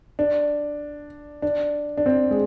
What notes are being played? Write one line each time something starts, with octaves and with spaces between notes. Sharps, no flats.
D4
D4
D4
C4
G#3